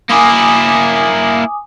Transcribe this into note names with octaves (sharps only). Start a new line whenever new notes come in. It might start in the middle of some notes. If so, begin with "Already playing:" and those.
A#3 E4 G#5 D6 D#6